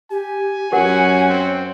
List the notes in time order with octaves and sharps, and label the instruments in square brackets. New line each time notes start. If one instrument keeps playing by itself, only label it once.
[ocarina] G4 [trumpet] G#5
[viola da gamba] F#2 C#4 F#4 [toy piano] G4 A#4 F#5 [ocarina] C#5
[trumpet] C4